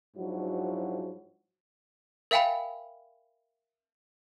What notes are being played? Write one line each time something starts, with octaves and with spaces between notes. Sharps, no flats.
G#2 F3 F#3 D4 E4 F#4
A#4 E5 F5 G5 G#5 B5